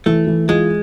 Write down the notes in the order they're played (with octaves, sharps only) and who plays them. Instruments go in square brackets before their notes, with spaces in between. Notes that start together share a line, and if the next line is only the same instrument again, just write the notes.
[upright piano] E3 [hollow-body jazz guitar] A3
[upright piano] E3
[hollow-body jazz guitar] G#3 [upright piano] F4